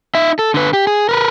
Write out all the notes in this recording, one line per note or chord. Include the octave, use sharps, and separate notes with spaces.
D#4 E5
A4
D3 B4
G4
G#4
A#4 B4